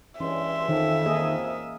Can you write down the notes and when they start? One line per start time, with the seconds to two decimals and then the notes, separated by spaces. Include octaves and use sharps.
0.20 G2 E3 G#3 C#4 E5 C6
0.68 F2 D#3
1.06 A#3 G#4 D#5